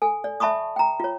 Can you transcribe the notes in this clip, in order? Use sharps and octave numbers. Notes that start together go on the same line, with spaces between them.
A4 G#5
D5
E5 A5 B5 C#6 D#6
G5 A#5
F4 C#5